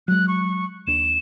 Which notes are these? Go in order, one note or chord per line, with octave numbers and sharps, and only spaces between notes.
F#3 G#3 F#6
C#6
D#2 D4 E7